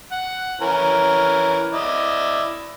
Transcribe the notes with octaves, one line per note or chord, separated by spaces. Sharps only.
F#5
E3 C#4 A#4
E4 D5 D#5